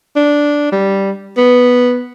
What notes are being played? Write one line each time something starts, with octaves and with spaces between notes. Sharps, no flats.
D4
G3
B3